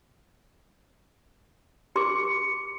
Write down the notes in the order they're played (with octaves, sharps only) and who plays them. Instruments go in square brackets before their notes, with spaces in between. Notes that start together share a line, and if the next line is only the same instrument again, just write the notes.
[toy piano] G4 C6 D6 [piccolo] C#7